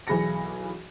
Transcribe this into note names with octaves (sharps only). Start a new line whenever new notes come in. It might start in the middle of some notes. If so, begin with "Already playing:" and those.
B1 E3 G#4 B5 A#6 C#7